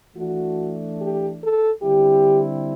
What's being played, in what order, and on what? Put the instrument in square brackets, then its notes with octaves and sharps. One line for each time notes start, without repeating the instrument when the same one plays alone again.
[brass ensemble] E3 A3 D4 F#4
G4
A4
D3 G3 C4 E4 G4